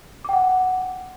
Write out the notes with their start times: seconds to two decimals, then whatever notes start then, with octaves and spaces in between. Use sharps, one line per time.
0.25 D6
0.29 G5
0.33 F#5